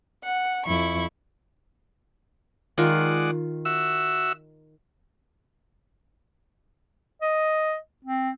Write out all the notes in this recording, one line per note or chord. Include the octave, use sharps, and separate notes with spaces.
F#5
F2 E4 C#6
D#3 G#3 F4 D5 F#5
F#4 E5 E6
D#5
C4